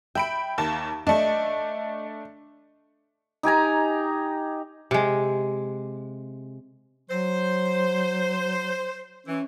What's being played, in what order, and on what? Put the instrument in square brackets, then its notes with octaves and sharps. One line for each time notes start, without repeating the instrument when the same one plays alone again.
[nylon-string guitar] E5 [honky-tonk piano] G5 B5 D7
[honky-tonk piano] D#2 A#3 A5
[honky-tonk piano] A3 D4 [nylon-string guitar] D5 D#5 A5
[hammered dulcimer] D#4 G4 G#5 A#5
[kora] C3 G#3
[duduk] F#3 [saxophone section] C5
[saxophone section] E3 [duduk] C#4